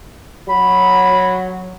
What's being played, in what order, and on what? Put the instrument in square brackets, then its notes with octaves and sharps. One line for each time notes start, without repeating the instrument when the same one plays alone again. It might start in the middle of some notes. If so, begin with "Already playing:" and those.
[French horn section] F#3 [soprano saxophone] B5